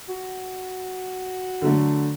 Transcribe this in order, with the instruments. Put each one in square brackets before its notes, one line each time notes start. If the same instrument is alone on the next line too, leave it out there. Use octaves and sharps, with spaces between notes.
[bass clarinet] F#4
[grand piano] D3 F#3 A3